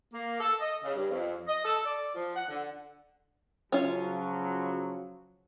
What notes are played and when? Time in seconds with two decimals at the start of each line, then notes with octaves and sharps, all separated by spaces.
0.12 A#3
0.40 A4
0.60 D#5
0.83 C#3
0.95 G2
1.10 F2
1.48 D#5
1.64 A4
1.85 D5
2.15 F3
2.35 F#5
2.48 D3
3.72 C#3 F3 F#3 C#4 F4